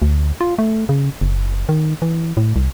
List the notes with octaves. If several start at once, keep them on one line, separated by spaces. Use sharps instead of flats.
D2
F4
A3
C#3
F#1
D#3
E3
A2
C2